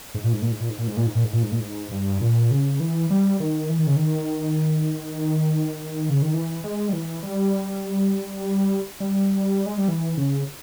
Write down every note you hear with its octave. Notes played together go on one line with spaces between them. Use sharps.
G#2
A#2
G#2
A#2
G#2
A#2
G#2
A#2
G#2
A#2
G#2
A#2
G#2
A#2
G#2
A#2
G#2
G2
A#2
C#3
E3
G3
D#3
E3
D#3
C#3
D#3
C#3
D#3
E3
G#3
G3
E3
G3
G3
G#3
G3
E3
C#3